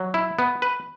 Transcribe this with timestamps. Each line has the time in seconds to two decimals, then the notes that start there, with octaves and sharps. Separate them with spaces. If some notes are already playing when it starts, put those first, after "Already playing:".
Already playing: F#3
0.14 E4
0.39 B3
0.62 B4